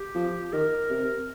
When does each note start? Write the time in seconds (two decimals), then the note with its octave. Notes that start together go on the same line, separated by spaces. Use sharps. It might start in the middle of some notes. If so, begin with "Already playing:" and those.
Already playing: G4
0.15 F3
0.53 D#3 A#4
0.90 C3